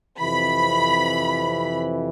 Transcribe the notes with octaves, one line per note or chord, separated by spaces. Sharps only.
F2 C3 E3 B5